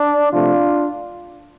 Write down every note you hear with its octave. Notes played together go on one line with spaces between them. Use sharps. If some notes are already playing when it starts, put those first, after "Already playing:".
Already playing: D4
C3 F3 A3 D4 F4